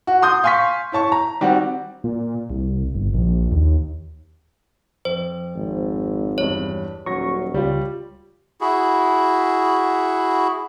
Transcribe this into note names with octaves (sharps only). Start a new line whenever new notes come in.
F#4
C6 D#6 G6
F5 G#5 C6 C#6 B6
E4 C#5 A5 C#6
A#5
D#3 G3 C4 F#4
A#2
C2
G1
A#1
D#2
F2 C5
G#1
E2 G2 C#5
D#1 F#3 C#4 C#6 A#6
C#2 G3 F4 C#5 D5
E4 F#4 G#4